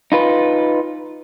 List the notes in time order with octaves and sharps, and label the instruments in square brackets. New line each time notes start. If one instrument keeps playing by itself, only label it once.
[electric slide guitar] D#4 F4 B4